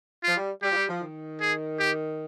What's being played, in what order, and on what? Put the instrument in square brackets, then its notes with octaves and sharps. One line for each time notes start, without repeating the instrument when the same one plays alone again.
[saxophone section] F3 [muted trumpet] F4
[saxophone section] G3
[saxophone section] G3 [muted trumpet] G4
[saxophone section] F3
G3
F3
D#3
[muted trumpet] G#4
G4